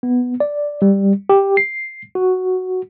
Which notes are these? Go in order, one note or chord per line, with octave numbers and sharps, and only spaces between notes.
B3
D5
G3
G4
C7
F#4